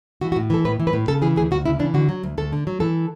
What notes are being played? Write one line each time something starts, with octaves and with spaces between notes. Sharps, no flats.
E3 F#4
F#4
A2
E3 A4
A2 B4
E3
B4
A2
C#3 A4
E3 G#4
D2 G#4
D2 F#4
C#3 E4
E3 D4
D3 F#4
F#3
D2
D2 A4
D3
F#3
E3 A4